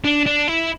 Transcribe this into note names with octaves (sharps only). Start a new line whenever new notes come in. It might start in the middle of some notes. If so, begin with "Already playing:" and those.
D4
D4
E4